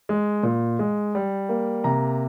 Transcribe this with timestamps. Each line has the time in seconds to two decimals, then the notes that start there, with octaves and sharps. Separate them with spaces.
0.09 G#3
0.43 A#2
0.79 G#3
1.15 G3
1.49 A#3
1.84 C3 A#5